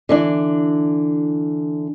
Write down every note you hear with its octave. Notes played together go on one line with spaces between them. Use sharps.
D3 E3 D4